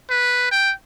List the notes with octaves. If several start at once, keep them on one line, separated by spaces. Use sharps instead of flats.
B4
G5